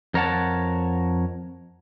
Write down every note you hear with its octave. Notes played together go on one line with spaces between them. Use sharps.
F2 A#4 C#5 F#5 A5